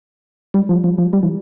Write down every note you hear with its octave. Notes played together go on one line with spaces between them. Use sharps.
G3
F3
F3
F3
G3
E3